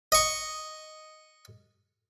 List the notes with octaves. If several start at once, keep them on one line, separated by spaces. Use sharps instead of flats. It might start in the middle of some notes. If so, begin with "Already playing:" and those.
D#5 C#6